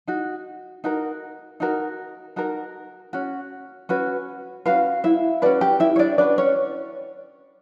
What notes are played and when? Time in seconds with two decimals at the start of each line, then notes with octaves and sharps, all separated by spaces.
0.07 D#4 F#4
0.84 D#4 F#4 A#4
1.60 D#4 F#4 A#4
2.36 D#4 F#4 A#4
3.13 C#4 F#4
3.89 C#4 F#4 B4
4.66 C#4 F4 F#4 B4 F5
5.04 E4 E5
5.42 C#4 D4 F#4 B4 D5
5.61 G4 G5
5.80 E4 E5
5.96 C#5
5.99 D4 D5
6.18 C#4 D4 F#4 B4 D5
6.38 C#4 C#5